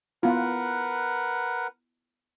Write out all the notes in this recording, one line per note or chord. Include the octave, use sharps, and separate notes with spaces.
B3 E4 F4 A#4 B4 F#5